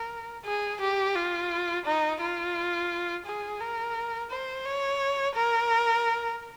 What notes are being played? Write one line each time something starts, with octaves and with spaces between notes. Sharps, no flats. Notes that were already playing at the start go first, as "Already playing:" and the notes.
Already playing: A#4
G#4
G4
F4
D#4
F4
G#4
A#4
C5
C#5
A#4